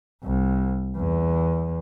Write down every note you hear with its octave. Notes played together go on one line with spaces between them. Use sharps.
C2
E2